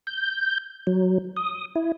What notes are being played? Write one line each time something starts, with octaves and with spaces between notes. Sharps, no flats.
G6
F#3
D#6
E4